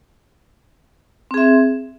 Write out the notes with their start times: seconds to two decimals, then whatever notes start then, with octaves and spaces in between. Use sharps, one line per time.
1.31 C4
1.34 G#4
1.38 E5